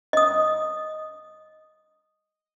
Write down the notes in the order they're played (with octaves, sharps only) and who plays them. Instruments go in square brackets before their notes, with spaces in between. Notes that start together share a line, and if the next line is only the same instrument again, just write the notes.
[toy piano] D#5 D#6